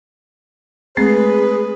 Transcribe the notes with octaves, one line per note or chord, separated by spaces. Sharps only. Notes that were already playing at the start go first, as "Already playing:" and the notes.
G#3 A3 C4 G#4 B4